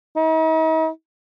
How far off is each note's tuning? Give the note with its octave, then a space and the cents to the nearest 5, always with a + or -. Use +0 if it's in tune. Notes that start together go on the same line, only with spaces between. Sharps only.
D#4 +45